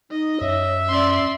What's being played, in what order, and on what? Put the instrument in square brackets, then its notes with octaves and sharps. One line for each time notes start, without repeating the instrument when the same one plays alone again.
[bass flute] D#4 [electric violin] D#5
[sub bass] F#2 [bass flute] C#5 [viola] E5
[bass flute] C#4 [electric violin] D5 C6